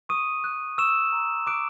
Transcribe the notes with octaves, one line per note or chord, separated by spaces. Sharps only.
C#6 D#6 D#7
F#6
C#6 E6 E7
A#5
D6 F#6 D7